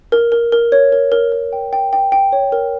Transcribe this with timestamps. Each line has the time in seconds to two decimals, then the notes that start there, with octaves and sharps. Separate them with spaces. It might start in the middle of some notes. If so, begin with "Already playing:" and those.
0.12 A#4
0.32 A#4
0.52 A#4
0.72 C#5
0.92 A#4
1.12 A#4
1.32 A#4
1.53 G5
1.73 G5
1.93 G5
2.12 G5
2.32 C#5
2.52 A#4